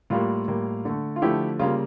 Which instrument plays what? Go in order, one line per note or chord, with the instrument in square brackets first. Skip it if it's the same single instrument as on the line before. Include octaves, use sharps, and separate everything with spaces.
[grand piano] A2 G3 A#3 F4
A2 G3 A#3
D3 A3
F4
D3 F3 A3 E4 G4
C#3 G3 A#3 F4